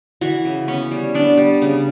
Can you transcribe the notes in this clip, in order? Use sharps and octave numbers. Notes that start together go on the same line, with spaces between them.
E3 F#4
C#3
B3 C#4
G3
B3 D4
G3
C#3